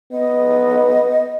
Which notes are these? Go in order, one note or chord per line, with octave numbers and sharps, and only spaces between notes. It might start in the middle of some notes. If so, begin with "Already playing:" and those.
B3 D#5